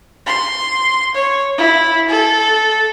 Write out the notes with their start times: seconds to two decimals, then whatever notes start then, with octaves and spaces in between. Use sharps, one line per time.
0.26 C6
1.15 C#5
1.58 E4
2.09 A4